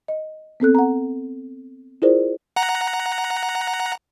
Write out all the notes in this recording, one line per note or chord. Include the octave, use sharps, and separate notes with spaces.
D#5
B3 C4 A4 F#6
F#5 A#5
E4 F4 G#4 A#4 C5 D5
F#5 A#5